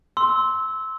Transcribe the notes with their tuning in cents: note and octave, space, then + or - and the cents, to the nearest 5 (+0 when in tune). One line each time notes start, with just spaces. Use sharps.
C6 +0 E6 -15